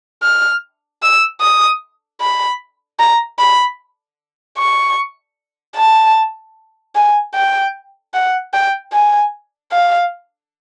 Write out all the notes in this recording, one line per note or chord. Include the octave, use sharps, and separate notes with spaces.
F6
E6
D#6
B5
A#5
B5
C#6
A5
G#5
G5
F#5
G5
G#5
F5